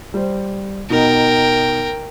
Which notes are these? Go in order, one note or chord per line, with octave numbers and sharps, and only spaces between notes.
G3 C5
B2 D#4 A#4 G5